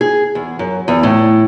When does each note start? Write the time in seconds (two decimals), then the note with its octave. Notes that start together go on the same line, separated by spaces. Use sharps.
0.01 G#4
0.35 E2
0.59 F#2
0.88 E2
1.03 A2